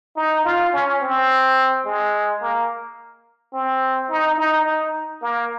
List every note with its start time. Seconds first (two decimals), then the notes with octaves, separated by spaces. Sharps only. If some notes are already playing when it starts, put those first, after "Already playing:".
0.16 D#4
0.45 F4
0.73 C#4
1.01 C4
1.85 G#3
2.41 A#3
3.53 C4
4.10 D#4
4.38 D#4
4.66 D#4
5.22 A#3